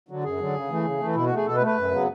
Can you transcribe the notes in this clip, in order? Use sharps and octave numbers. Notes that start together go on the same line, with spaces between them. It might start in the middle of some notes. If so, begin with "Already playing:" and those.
D3 F#3
F#2 G#4
D3 F#3
C#3
E3 A3
C#3
E3 A3
B2 E4
F#4
A3
G#4
B2 A4
B4
A3
B4
F#2
C#3 F#3 B3